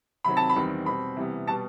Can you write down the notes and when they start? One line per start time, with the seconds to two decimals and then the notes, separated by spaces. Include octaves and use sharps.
0.24 C3 D#3 F#3 C4 B5
0.37 A5
0.50 B5
0.56 E2 D#3 G3 C4
0.86 B2 G3 C4 B5
1.17 C3 E3 G3 B3
1.47 B2 G3 B3 A5